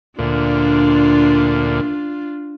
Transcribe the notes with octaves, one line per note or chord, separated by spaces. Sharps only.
D2 A#2 D4 F4